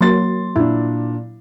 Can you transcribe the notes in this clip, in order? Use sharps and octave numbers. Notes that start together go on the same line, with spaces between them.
F#3 A#3 C6 A6
A#2 D4 E4